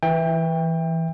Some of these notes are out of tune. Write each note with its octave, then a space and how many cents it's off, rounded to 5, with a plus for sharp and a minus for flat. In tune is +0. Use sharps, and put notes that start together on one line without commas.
E3 +0 E5 +0 G5 +25